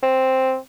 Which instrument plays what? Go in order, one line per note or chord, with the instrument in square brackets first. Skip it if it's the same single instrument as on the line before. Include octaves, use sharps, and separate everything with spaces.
[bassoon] C4